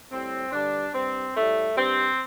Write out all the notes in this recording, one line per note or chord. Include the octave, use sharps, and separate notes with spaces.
A2 G3 C4
G2 D3 G3 D4
G2 G3 C4
A2 G3 A3
G2 G3 C4